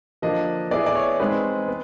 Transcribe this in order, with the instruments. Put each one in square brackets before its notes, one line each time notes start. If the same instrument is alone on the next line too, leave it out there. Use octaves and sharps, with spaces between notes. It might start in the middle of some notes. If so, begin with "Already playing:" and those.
[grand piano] D3 F3 A#3 D4 [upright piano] D#5
[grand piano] B3 E4 G#4 [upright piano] D5
[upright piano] D5
C#5
[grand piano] G#3 C4 D#4 G#4 [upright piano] B4
[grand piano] B3